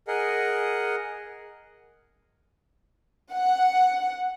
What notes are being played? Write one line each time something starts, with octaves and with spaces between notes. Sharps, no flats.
G#4 A#4 D#5 F#5
F#5